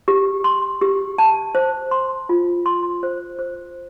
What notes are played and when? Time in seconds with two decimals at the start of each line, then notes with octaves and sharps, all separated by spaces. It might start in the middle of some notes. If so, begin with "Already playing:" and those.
0.08 G4
0.44 C6
0.81 G4
1.18 A5
1.55 C5
1.91 C6
2.29 F4
2.66 C6
3.03 C5
3.39 C5